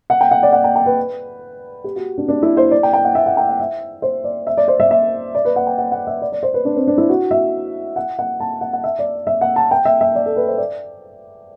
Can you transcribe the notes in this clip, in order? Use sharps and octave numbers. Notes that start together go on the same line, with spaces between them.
F#5
G5
F#5
D5
F#5
G5
G5
B4
G4
F#4
D4
D4
E4
C5
D5
G5
G5
F#5
E5
F#5
G5
F#5
E5
C5
D5
E5
D5
C5
E5
E5
D5
B4
F#5
G5
F#5
F#5
E5
D5
D5
C5
B4
D4
C4
D4
E4
F#4
E5
F#5
F#5
A5
F#5
F#5
E5
D5
E5
F#5
A5
G5
E5
E5
D5
A4
B4
C5
D5